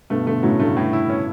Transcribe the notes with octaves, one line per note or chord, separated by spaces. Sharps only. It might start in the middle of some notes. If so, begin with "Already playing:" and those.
G2 B2 A3
B2 D3 A3
A2 C#3 F#3
G2 A3
A2
E4
C#4